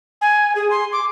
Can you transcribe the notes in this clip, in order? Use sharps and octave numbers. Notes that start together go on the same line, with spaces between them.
G#5
G#4
C6
D6